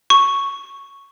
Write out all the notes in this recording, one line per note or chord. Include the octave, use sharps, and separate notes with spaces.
C#6